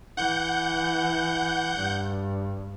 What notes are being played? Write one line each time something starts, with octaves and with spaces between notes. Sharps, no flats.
E3 F#5 G6
G2